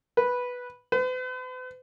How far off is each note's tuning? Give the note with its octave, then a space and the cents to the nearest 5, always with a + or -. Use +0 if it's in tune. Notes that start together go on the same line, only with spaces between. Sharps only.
B4 -5
B4 +45